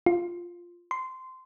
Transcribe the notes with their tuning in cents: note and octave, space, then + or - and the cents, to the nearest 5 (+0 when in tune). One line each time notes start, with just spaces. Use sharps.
F4 +0
C6 -15